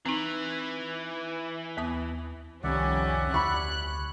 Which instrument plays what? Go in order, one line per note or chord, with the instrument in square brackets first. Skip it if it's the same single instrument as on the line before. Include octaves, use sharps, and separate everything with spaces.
[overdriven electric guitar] E3 [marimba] C4 D#4
[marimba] D#2 B3 D#6
[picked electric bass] C2 D#3 [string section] F2 G3 C#4 [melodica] D5 E5 F#5
[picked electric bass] D2 [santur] C#5 B5 C#6 [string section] F#6